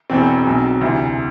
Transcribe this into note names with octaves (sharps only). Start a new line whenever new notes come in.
E1 E2 B2 C4
B1 B2 F#3
D2 C3 E3